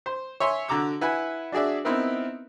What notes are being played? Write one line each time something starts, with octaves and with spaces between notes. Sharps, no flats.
C5
C#5 E5 G#5 C6
D3 F#4 A#5 D6 E6
E4 B4 F#5 G#5
D4 F#4 G#4 D5 E5
B3 C4 D#4 E4 A#4 B4